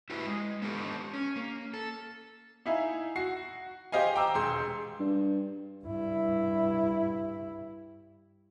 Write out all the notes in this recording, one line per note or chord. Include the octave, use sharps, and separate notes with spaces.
E4 F#4 G4 B4
G#3
B3 D#4 G4 A4
C#4
A#3
A4
D#4 E4 E5 F5 G#5
F#4 C7
G4 C5 D#5 F5 G#5
G5 A#5 D6 E6
E1 G#3 C6 G6
G2
G2 E4